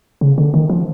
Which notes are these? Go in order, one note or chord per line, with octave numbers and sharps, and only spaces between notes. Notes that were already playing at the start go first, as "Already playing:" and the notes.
C#3
D3
D#3
F3